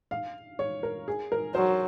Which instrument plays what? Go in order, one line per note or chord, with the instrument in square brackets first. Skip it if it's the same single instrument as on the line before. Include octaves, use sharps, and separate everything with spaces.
[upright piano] F5
C#5
A#4
G#4
A#4
[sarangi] F#3 [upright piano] C5